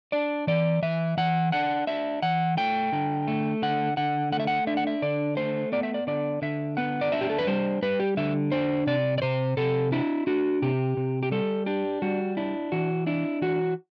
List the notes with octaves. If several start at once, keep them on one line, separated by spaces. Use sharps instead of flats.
D4 D5
E3 D5
E3 E5
E3 F#5
D4 F#5
D4 E5
E3 F#5
A3 G5
D3
A3
D3 F#5
D3 F#5
A3 F#5
E5
F#5
D4 E5
F#5
E5
D3 D5
A3 C5
B3 D5
E5
D5
D3 D5
D3 E5
B3 F#5
D5
D4 E5
G4
A4
B4
G3 C5
G3 B4
G4
D3 E5
D4 C5
C3 D5
D5
C3 C5
C3 A4
D4 E4
D4 F#4
C3 G4
C3
G4
G3 A4
D4 G4
G3 F#4
D4 E4
E3 F#4
D4 E4
E3 F#4